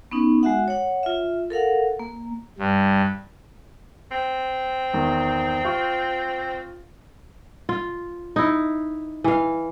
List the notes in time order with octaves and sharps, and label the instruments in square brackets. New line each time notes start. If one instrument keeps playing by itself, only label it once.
[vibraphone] B3 C#4 D#4
G#3 F#4 E5 F#5
C#5 F#5
F4 E5
A4 A#4 F5 F#5
A#3
[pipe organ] G2
[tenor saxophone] C4
[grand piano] E2 D#3
F4 C#6
[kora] F4
D#4 E4
E3 F5